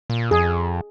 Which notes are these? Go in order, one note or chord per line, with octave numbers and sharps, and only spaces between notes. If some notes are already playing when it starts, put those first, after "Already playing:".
A#2
F2 G#4